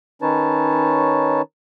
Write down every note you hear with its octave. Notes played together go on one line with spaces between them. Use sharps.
D#3 C#4 D#4 B4 C#5 A5